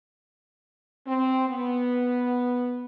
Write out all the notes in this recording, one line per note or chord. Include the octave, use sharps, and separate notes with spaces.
C4
B3